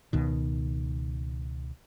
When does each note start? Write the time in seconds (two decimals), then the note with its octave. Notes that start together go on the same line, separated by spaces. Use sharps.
0.13 C#2 B2 D#3